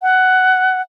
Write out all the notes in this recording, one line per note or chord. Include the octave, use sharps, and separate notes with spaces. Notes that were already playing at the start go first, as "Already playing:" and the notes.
F#5